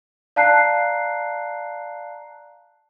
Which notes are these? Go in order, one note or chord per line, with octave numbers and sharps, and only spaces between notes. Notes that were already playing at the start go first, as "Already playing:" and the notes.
D5 F5 A5 A#5 F#6 C7